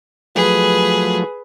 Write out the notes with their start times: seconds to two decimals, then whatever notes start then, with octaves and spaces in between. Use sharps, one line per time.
0.35 F3 F#3 A3 G#4 B4